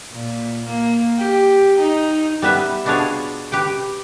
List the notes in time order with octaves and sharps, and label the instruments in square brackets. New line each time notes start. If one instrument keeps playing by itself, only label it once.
[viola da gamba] A#2
A#3
G4
D#4
[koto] G3 B3 B4 E5
B2 B3 D4 F4 G#4 C#5
G4 B4 G5